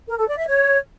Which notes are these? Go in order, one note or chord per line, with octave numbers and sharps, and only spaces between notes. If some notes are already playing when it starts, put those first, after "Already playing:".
A#4
A4
D5
E5
C#5